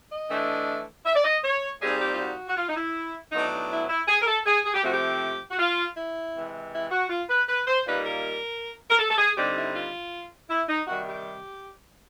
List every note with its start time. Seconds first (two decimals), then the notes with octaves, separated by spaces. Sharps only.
0.11 D#5
0.30 E3 A3 D4
1.05 E5
1.15 D5
1.24 D#5
1.43 C#5
1.81 A#2 G3 C4 D#4 G#4
2.00 G4
2.12 F4
2.19 F#4
2.48 F#4
2.57 F4
2.69 D#4
2.76 E4
3.32 A2 F#3 B3 D4 D#4
3.51 D#4
3.70 E4
3.89 E4
4.08 G#4
4.22 A#4
4.26 A4
4.46 G#4
4.65 G#4
4.74 G4
4.83 C3 F3 A3 C4 F#4
4.93 G4
5.51 F#4
5.59 F4
5.96 E4
6.34 C3 E3 G#3
6.72 E4
6.91 F#4
7.09 F4
7.29 B4
7.48 B4
7.67 C5
7.85 A#2 G3 A#3 D#4 B4
8.05 A#4
8.90 A#4
8.99 A4
9.09 A4
9.18 G#4
9.37 D3 G3 C4 D#4 G4
9.55 E4
9.74 F4
10.50 E4
10.68 D#4
10.87 C3 D#3 G3 F#4
11.07 G4